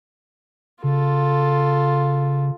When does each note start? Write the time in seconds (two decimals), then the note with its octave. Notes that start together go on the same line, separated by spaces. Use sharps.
0.84 C#3 F4 A4